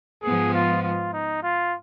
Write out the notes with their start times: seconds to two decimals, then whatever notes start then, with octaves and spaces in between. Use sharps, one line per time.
0.23 G#2 F3 B3 G#4
0.54 F4
0.83 F4
1.13 D#4
1.43 F4